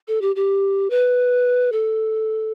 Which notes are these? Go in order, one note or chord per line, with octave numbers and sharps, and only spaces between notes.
A4
G4
G4
B4
A4